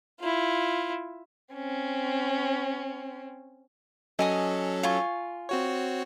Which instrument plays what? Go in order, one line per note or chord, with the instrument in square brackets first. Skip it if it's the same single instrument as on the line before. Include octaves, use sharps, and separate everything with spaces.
[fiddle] E4 F4
[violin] C4 C#4
[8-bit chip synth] F#3 C#4 A4 [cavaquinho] D#5 G#5 D#6
[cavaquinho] F4 G#5 C#6
[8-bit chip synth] C4 F#4 C#5